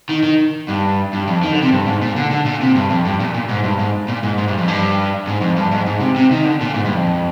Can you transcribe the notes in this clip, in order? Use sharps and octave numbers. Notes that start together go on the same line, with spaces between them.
D#3
D#3
G2
G2
F2
D#3
D3
C3
G2
G#2
A#2
D3
D3
A#2
C3
G2
F2
G2
A#2
A#2
G#2
G2
G#2
A#2
G#2
G#2
G2
F2
G2
G#2
F2
G2
G#2
G#2
C3
C3
D#3
D3
A#2
G#2
G2
F2